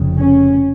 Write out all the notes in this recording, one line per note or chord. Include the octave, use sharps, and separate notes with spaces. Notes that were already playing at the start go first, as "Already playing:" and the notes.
Already playing: F1 F2 C#3
C#4